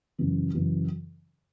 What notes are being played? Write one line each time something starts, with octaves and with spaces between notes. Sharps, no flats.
F#2 C#3 E3
F#2 C#3 E3